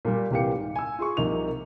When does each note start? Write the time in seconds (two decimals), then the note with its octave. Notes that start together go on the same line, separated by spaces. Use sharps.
0.05 A#2 G3
0.31 C2 A#2 E3 G4 F5 C#7
0.54 G#2
0.76 G#5 E6
0.99 F4 G#4 C#6
1.17 C2 C3 F3 A#3 D#4 F7